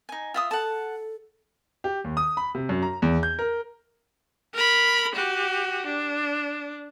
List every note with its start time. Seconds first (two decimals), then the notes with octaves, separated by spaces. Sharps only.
0.09 D#4 G#5
0.34 F4 E5 D#6
0.51 A4 F#5 A5
1.84 G4
2.04 D#2
2.17 D#6
2.37 B5
2.55 C3
2.69 F#2
2.82 A#5
3.02 E2
3.23 G6
3.39 A#4
4.54 A#4 B5
5.15 F#4 G4
5.86 D4